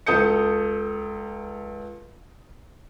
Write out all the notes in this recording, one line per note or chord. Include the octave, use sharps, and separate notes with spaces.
C#2 A4 D#6 G6 C#7